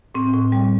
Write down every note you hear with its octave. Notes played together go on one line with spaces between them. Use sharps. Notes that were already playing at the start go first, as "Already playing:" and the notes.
A2 C4
A2
G3